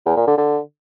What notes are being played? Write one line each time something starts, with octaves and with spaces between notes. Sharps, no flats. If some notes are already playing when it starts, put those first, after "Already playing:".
E2
A#2
D3
D3